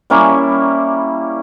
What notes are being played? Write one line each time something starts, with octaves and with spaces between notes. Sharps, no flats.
G3 A#3 C#4 E4